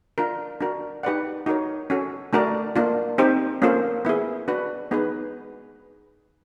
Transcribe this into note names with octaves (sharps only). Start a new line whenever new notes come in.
D4 F4 A#4
D4 F#4 A#4
D#4 G4 B4 D5 F#5
D#4 F#4 A#4 C#5
C#4 F#4 A4
A3 D4 F#4 A#4 D5
A#3 D4 F4
C4 D#4 G4 C5
A#3 C#4 F4 A4 C5
B3 E4 G#4
D4 F#4 B4
B3 D#4 G#4 B4